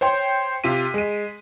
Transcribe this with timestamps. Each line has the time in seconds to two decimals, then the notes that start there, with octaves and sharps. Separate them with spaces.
0.01 C5 C#5 G5 C6
0.64 C3 F4 B6 D#7
0.94 G#3 D#7